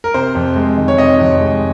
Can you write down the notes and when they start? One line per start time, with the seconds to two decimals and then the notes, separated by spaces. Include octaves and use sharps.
0.04 A#4
0.14 C3 C5
0.35 F2
0.56 G#3
0.77 D#3
0.88 C#5
0.98 C3 D#5
1.19 F2
1.40 G#3